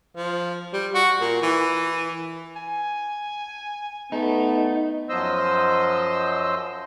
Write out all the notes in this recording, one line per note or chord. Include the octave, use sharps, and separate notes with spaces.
F3
G3
F#4
A#2
E3
G#5
A3 B3 D#4
F#2 F3 F#3 C5 D#5 E6